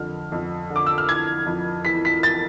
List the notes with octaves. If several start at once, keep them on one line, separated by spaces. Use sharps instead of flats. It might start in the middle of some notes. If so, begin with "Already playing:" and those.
Already playing: F2 D3 F6
F2
D3
D6
E6
F6
E3 G#6
F2
E3 B6
B6
A6